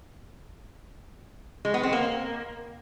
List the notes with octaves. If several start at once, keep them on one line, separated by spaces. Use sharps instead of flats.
G#3
B3
C4
A#3